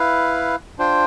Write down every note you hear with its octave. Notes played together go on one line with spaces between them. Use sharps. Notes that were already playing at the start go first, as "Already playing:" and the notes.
Already playing: E4 B4 F5
D4 F4 C5 G5